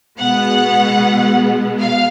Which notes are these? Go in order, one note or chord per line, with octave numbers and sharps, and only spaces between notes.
B2 G#3 B3 F#5
F5